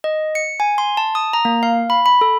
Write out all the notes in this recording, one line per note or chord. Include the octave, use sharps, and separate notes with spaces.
D#5
C#7
G#5
C6
A5
D#6
A#5
A#3
F5
B5
B5
A4